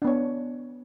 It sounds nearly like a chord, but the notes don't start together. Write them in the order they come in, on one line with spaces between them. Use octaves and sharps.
D4 B3 C#5